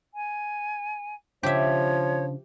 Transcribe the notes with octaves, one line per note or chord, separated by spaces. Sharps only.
G#5
C#3 F3 C#4 D4 G4 C#5 E5